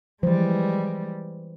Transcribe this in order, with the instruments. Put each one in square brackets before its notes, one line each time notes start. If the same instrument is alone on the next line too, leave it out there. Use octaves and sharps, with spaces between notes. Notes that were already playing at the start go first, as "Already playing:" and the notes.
[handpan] E3 C5 [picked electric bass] F3 [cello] G3 G#3